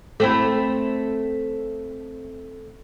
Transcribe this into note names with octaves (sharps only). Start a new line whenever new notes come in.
A3 C4 E4